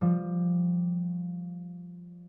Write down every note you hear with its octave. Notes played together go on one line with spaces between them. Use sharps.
F3 G3